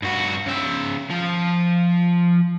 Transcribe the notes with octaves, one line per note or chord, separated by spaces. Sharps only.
G2 F#4
C#3 E5
F3